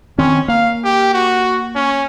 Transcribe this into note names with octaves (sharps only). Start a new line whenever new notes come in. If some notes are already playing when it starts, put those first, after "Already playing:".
D#3 C4 C#4
A#3 F5
G4
F#4
C#4